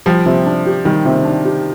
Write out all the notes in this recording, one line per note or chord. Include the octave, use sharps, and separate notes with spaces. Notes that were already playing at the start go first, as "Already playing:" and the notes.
F3 G3
C3
D4
G4
D#3 G3
C3
D4
G4